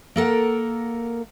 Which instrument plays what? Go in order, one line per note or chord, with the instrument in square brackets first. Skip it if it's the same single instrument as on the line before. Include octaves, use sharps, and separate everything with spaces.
[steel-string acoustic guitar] A#3 A4 A#4 F#5